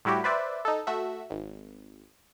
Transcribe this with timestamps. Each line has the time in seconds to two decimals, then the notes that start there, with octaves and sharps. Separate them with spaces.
0.05 A2 G3 E4 F#4 G4
0.24 B4 C5 D5 E5
0.65 D#4 A4
0.87 A3 F#4 E5
1.30 G#1